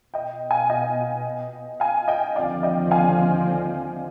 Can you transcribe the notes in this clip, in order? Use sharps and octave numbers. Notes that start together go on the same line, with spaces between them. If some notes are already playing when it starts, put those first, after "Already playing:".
B2 B3 D#5 G5
F5 G#5
D#5 G5
F5 G#5
D#5 G5
D#2 D3 F3 C4 D5 F5
D#5 G5
F5 G#5